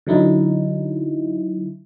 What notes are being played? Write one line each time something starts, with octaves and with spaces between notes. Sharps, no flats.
D3 F#3 D#4 E4